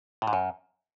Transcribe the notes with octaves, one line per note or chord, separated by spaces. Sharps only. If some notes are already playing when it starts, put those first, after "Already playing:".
A2
G#2
F#2